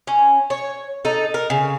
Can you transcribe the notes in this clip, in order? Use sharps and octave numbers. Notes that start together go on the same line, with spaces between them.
C#4
C#5
D#4 A4
A#4
C#3